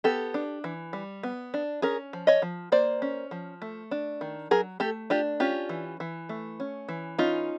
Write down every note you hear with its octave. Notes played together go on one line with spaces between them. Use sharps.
B3 G4 A4
D4
E3
G3
B3
D4
C#4 G#4 A#4
F3
C#5 D#5
F3
A#3 C5 D5
C#4
F3
A3
D4
D#3
F#3 G#4 A#4
A3 G4 A4
D4 F4 G4
C#4 F4 G4
E3
E3
A3
C#4
E3
C#4 D#4 F4